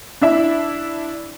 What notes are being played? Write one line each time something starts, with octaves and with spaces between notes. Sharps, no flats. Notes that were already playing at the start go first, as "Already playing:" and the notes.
D4 E4 E5